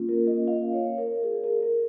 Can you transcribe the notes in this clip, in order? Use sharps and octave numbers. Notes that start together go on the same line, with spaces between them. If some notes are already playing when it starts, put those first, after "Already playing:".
Already playing: A#3 C#4 F4
A#4
D#5
F5
C#5
A#4
G#4
A#4
A#4